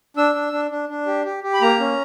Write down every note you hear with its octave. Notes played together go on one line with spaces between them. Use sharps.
D4 E6
D4
D4
D4
D4
G4
G4
G4
B5
A#3 A#5
C#4